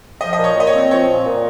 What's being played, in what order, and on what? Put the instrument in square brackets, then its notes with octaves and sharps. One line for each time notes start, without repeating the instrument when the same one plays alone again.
[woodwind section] F3 [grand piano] D#5
[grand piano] D#5
[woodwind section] A#2
[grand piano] C#5
[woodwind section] A#2 [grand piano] D#5
[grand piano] C#5
[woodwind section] C4
[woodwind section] F3 [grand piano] C#5
[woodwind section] A#2
A#2